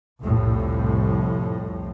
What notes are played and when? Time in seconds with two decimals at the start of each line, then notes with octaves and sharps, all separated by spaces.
0.21 C2 F2 A2